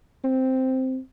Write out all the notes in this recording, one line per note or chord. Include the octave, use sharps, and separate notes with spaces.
C4